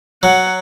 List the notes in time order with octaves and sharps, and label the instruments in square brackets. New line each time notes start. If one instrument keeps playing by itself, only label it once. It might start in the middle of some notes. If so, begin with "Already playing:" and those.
[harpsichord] F#3 [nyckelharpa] F#5